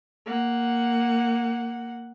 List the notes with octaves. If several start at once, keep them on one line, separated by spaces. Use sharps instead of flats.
A#3 F#5